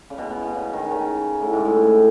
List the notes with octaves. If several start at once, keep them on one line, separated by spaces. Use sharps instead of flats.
C#3
B2
B2
B2
C#3
D#3
D#3
C#3
A2
G#2
A2
A2